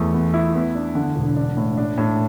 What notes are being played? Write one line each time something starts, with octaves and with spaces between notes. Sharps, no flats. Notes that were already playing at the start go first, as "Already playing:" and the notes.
Already playing: E2 A3
B3
E4
B3
D4
D3
E1
D4
A2
D4
A2